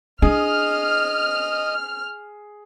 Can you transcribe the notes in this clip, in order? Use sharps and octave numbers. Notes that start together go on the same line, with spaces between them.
D4 E4 G#4 D#5 F6